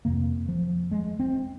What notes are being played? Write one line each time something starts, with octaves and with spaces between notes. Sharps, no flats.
F2 C3 A#3
F3
G#3
C4